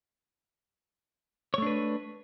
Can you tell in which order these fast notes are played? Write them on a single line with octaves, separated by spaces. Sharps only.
C#5 A3 D4 B4